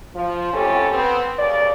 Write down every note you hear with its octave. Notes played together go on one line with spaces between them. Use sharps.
F3
F2 A2 C#4 G4 A4
B3 C4
D#2 C#3 D5